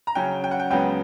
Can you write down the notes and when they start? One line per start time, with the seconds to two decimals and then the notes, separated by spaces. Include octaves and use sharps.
0.07 A#5
0.15 C#3 F#3 C#4 G5
0.44 G5
0.51 F#5
0.60 G5
0.71 C#2 C#3 F#3 B3 G5